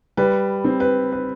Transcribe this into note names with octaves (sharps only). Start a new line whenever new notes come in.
G3 B4
C4
B4
B4